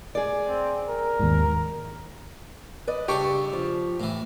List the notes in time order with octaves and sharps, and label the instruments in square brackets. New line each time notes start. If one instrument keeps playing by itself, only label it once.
[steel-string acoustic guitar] G#4 D5
[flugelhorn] C4
A#4
[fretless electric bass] D#2 G#2
[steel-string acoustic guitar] B4 D5 D#5
[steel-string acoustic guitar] G2 [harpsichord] C#3 D4 A4 [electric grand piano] G4 C#6
[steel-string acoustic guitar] F3
[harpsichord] A2 E3